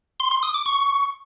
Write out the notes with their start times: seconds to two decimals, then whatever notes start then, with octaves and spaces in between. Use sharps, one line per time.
0.20 C6
0.31 C6
0.43 D#6
0.54 D6
0.66 C#6